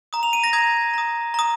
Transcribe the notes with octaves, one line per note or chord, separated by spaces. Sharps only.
A#5 D#6
F7
D#7
A#6
A#5 D#6 G#6
A#5 D#6
A#5 D#6